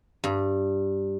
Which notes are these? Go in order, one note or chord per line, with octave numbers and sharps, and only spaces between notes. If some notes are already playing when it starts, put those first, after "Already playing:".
G2